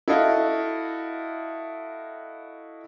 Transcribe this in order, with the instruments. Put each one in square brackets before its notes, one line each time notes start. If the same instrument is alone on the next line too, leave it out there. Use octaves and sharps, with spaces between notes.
[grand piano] E4 F#4 A4 D#5 F5